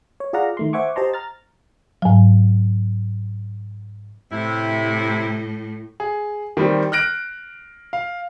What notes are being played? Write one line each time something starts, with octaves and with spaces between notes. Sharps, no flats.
C#5
F4 G#4 D5 F5 F#5 A#5
D#3 A3 C6
C5 E5 F#5 G#5 C#6 D6
G4 C5 D#5 A5 A#5 C6
A#5 F6 A6
G#2 F#3
A2 C3 E4
G#4
D#3 G3 C4
F6 F#6 A#6 D7
F5